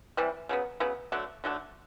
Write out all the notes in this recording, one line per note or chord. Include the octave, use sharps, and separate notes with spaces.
C3 E3 G3
C#3 F#3 B3
C#3 F#3 B3
D3 F#3 A3 D4
D3 F#3 A3 D4